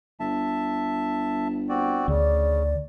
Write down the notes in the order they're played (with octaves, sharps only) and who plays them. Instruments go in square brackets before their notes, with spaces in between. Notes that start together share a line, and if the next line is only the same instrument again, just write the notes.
[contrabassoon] G1 [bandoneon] E5 A5
[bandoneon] C4 F#4 D5
[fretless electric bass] D2 [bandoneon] C#3 [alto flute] D5